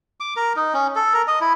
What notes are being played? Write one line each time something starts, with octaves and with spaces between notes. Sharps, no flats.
D6
A#4
D#4
C#4
A4
A#4
D#5
E4